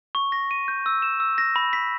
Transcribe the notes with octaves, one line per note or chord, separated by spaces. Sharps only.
C#6
A#6
D#7
G6
E6
E7
E6
A#6
B5
B6